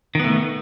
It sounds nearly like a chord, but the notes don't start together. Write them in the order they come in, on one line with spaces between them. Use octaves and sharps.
D#3 B3 A3